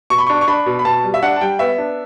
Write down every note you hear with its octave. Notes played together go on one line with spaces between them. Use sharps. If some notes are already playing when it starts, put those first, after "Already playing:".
B2 C#6
B5
D4 C#6
C#6
D4 B5
B2
B5
B2 A5
G3
E5
D4 F#5
A5
G3 G5
B3 E5
D4